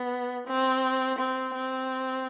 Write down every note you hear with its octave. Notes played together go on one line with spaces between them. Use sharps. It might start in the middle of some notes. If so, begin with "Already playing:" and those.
Already playing: B3
C4
C4
C4